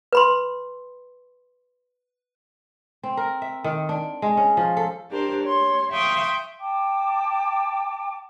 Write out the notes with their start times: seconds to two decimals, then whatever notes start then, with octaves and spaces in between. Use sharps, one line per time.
0.13 B4 B5 C6
3.03 C4
3.17 A#4
3.42 E5
3.64 D#3
3.89 D4
4.22 G#3
4.37 C#4
4.57 F3
4.77 A4
5.10 D4 G4 A#4 C5
5.43 C#5 C6
5.91 E5 F5 G5 C6 C#6 D#6
6.60 G5 A5 D6